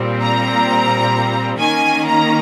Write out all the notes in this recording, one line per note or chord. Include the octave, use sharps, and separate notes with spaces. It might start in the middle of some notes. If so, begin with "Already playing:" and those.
Already playing: A#2 G3 C4
A#5
D#3 A#3 C#4 G#5
A#5